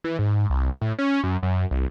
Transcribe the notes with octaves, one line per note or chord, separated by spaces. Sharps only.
E3
G#2
C2
A2
C#4
F#2
F#2
C2